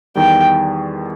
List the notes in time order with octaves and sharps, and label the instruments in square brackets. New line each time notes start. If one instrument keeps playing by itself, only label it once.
[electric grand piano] E2 D#3 G3 [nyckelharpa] G5